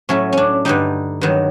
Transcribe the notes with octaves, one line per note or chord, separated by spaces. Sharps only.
A2 F#3 A3 C#4
C#4 D4
G2 D3 G3 D#4
G2 D#3 F#3